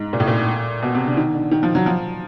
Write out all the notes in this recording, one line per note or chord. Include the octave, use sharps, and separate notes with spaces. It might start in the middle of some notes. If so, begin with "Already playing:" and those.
Already playing: G#2
A#2
A2
A#2
B2
C3
D3
D#3
D3
D#3
F3
F#3
F3